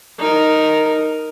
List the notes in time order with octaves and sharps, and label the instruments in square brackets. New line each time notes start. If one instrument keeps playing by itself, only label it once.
[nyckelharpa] D#4 A#4